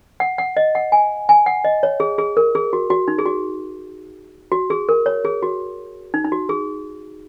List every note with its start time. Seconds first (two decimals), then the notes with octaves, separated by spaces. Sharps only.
0.20 F#5
0.38 F#5
0.57 D#5
0.75 F#5
0.92 G#5
1.29 G#5
1.46 F#5
1.64 D#5
1.83 C#5
2.00 G#4
2.18 G#4
2.37 A#4
2.55 G#4
2.73 F#4
2.90 F#4
3.08 D#4
3.18 G#4
3.26 F#4
4.52 F#4
4.70 G#4
4.89 A#4
5.06 C#5
5.25 G#4
5.43 F#4
6.14 D#4
6.25 D#4
6.32 F#4
6.49 G#4